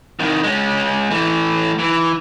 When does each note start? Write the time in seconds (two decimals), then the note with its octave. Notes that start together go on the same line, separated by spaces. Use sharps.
0.19 C2 D#3
0.44 G#3 C#4
1.11 E3 A3
1.79 E3